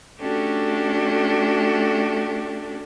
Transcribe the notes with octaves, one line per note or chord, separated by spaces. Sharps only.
A3 C#4 D4 F#4 G4 A4